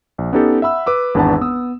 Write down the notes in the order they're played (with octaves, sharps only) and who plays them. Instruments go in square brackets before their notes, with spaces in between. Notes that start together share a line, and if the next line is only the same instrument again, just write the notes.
[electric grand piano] A#1
B3 C#4 D#4 G4 A4
E5 F#5 B5 E6
B4 D6 E6
G#1 E2 D4 B4 F#5 A5
B3 D#6 E6